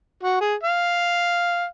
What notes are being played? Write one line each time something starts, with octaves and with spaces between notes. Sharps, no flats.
F#4
G#4
F5